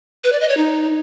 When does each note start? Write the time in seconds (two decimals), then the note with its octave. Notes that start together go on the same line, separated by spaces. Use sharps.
0.24 B4
0.32 D5
0.41 D#5
0.49 C#5
0.57 D#4